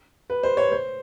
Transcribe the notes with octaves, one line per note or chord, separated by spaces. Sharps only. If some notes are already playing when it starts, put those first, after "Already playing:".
B4
C5
C#5
C5